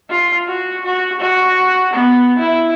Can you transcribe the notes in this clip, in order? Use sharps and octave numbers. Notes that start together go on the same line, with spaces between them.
F4
F#4
F#4
F#4
B3
E4